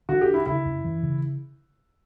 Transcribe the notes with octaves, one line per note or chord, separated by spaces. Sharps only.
D3 F#4
G4
D4
E4
C#3 E4
F#2
E3
C#3